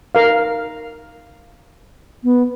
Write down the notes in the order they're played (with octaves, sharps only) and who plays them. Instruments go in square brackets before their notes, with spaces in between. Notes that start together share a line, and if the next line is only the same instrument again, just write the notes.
[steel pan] A#4 F5
[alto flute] B3